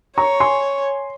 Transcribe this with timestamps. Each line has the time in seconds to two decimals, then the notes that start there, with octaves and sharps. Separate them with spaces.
0.17 C#5 A#5 C#6
0.40 G#5 C6